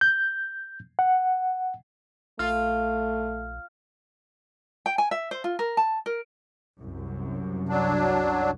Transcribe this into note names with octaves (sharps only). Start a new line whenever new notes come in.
G6
F#5
A#1 A3 F4 F6
G5
G#5
E5
C5
F4
A#4
A5
A#4
C2 F#2
F#3 D4